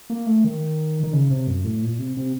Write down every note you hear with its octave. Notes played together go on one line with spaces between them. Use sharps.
A#3
A3
D#3
D#3
C#3
C3
F#2
A2
A#2
C3
C3